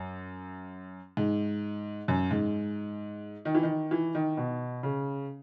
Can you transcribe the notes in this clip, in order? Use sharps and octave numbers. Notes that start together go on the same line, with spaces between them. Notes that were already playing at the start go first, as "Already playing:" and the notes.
Already playing: F#2
G#2
F#2
G#2
D#3
E3
D#3
E3
D#3
B2
C#3